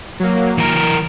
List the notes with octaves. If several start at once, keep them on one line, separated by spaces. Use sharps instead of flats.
F#3 A#3
E3 A#4 F6 D7